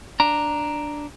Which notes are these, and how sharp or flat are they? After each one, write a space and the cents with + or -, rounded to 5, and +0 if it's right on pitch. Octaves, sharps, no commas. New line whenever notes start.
D4 +0 A#5 +0